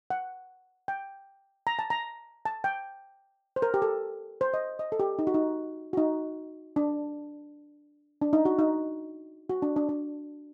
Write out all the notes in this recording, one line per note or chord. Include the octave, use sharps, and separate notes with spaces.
F#5
G5
A#5
A5
A#5
A5
G5
C5
A#4
G4
A4
C5
D#5
D#5
A4
G4
D#4
F#4
D#4
F#4
D#4
D4
D4
D#4
F#4
D#4
F#4
D4
D4
D4